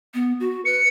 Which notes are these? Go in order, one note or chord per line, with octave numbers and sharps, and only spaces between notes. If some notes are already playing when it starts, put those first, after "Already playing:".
B3
F#4
B4 C#7